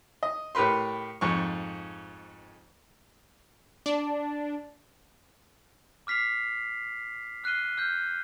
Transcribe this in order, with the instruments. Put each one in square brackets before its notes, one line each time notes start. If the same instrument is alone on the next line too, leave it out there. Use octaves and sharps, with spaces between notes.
[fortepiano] D#5
A2 G4 A#4 B4 C6
F2 G#2 C#6
[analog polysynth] D4
[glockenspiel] D6 F6 B6 C7 F7
F6 F#6 C7 D#7 G7
F6 G6